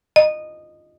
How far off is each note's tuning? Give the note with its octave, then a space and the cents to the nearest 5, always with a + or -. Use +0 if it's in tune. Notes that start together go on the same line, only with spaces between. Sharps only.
D#5 -15